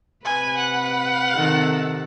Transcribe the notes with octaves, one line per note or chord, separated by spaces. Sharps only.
C3 B4 G#5
F#5
C3 D#3 A4